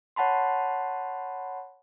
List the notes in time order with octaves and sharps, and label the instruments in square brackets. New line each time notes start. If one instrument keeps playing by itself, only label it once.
[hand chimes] C#5 F#5 A5 B5 C6